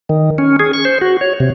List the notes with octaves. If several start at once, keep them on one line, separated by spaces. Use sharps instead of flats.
D#3
C#4
G#4
C#6
C5
F#4
C#5
C3